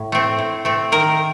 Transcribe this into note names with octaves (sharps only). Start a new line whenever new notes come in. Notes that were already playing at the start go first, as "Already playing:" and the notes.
Already playing: A2
A3 C4
A2
A3 C4
D#3 A#4